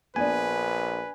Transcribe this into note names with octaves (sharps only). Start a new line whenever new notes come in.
A#1 B3 D4 B4 G#5